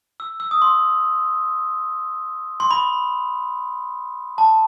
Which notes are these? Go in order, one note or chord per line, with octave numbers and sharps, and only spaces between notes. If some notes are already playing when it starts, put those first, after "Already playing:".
E6
E6
D#6
C6
C6
B5
A5